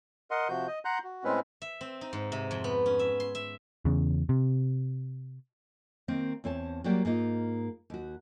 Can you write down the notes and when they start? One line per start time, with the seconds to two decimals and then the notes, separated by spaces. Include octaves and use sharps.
0.31 A#4 D#5 F#5 C6
0.49 C3 F3 F#4 G6
0.67 D#5
0.85 F#5 A#5 C6 F#6 G6
1.04 F#4
1.24 A2 G#3 C4 C#4 B4
1.62 E5
1.81 C4
2.01 D#4
2.13 G#2
2.32 C3
2.51 F2
2.64 B3
2.86 C#4
2.99 E5
3.20 C6
3.35 E5
3.85 E2 C#3
4.29 C3
6.08 D#3 A#3 C4
6.44 E2 C4 C#5 A5
6.84 F#3 G3 A#3 F#4 G4 D5
7.05 G#2 A#3 D#4 F4
7.90 D#2 F#4